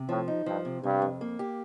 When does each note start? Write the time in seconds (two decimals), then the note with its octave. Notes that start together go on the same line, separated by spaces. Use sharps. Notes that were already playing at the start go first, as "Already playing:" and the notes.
Already playing: C3
0.09 A2 F3
0.28 D#4
0.46 G2 F3
0.65 C3
0.83 G2 C3
1.02 F2
1.21 A#3
1.39 G4